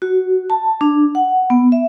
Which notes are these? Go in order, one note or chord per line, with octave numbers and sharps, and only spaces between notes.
F#4
A5
D4
F#5
B3
E5